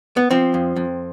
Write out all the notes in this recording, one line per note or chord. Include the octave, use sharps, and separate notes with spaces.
B3
F3 C4
F2
F2